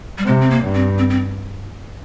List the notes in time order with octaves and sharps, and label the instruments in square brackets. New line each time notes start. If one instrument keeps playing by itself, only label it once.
[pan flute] G3
[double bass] C3 [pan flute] G#3
[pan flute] C4
A#3
[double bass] G2
[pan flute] C4
C4
C4